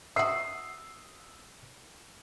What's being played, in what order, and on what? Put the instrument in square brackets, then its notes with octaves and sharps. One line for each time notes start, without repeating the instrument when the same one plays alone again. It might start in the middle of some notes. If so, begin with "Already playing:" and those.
[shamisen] F#4 E5 [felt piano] D#6 E6 C7